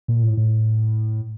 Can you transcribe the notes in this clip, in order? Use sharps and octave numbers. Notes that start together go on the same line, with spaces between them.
A#2
A2
A2